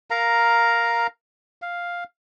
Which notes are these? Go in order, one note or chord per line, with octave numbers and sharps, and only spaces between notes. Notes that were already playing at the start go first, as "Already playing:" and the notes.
A#4 F5 A#5
F5